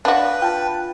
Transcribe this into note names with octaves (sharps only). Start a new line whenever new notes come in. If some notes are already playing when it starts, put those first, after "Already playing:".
D4 F#4 B4 F5 F#5 A5
F4 G5 A5